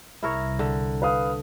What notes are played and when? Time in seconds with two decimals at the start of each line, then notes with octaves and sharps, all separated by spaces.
0.23 C2 E4 A#4 C#5
0.59 D3
1.02 B4 F5 D#6